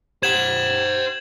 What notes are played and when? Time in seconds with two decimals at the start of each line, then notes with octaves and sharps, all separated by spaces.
0.23 G4 C5 F#5 G#6 E7 F#7